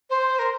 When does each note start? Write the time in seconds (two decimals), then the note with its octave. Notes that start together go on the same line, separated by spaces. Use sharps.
0.10 C5
0.39 A#4